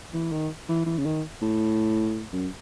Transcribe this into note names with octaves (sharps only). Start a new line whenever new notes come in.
E3
D#3
E3
E3
C#3
D#3
A2
F#2